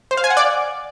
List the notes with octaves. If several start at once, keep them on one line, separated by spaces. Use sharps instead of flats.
C5
F5
G#5
F#5
D5